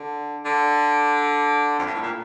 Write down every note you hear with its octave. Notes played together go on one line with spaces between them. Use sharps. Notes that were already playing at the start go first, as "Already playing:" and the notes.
Already playing: D3
D3
F2
G2
A2
A#2